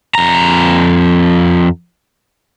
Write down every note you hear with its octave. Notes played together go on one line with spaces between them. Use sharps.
F2 A#5